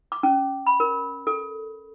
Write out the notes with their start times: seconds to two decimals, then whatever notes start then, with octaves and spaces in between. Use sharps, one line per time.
0.12 D6
0.23 C#4
0.67 B5
0.80 A#4
1.27 A4